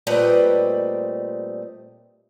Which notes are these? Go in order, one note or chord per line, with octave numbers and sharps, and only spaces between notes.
A#2 G3 A3 C4 B4 D#5